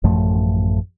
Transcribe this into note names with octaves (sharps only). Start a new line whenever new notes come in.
A1 F#2 F3 A3